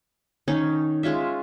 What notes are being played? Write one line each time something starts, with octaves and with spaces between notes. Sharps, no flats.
D#3 C#4 D#4
G#3 C#4 F4 E5